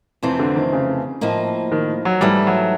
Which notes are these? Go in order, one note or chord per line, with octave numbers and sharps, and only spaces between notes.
F2 C3 E3 A3 C4
D3
D#3
C#3
A2 F3 A#3 D#4
D#3
F#3
G#2 E3 G3 A3
F#3